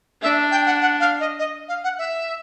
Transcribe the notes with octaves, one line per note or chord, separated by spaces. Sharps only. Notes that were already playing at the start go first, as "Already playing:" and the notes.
D4 E5
G5
F#5
F#5
F5
D#5
D#5
F5
F#5
E5